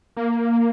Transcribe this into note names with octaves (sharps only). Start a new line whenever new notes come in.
A#3